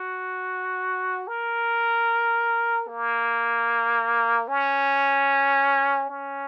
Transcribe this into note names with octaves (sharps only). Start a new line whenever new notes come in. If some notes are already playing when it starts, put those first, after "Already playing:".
Already playing: F#4
A#4
A#3
C#4
C#4